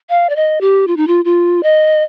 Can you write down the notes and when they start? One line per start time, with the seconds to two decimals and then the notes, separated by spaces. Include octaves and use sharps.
0.09 F5
0.29 D5
0.36 D#5
0.61 G4
0.87 F4
0.97 D#4
1.07 F4
1.25 F4
1.63 D#5